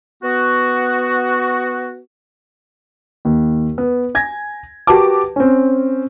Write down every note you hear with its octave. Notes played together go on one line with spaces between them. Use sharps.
B3 F#4
D#2
B3
G#5 G#6 A#6
F#4 G4 A#4 B4 A5 D6
C4 C#4